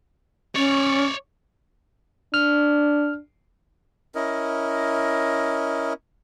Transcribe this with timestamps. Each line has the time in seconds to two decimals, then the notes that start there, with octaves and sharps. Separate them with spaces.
0.56 C#4 C#5 D5
2.34 D4 F6
4.15 C#4 E4 A#4 D#5